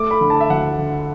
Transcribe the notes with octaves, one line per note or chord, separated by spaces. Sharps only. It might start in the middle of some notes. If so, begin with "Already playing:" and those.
Already playing: A3 D6
B5
D3
A5
E5
D2 F#5
D3